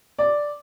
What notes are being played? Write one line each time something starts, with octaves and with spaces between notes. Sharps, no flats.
D5